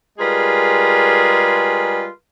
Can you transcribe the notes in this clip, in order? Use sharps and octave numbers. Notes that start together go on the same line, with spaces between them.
G3 G#3 F4 G#4 A#4 B4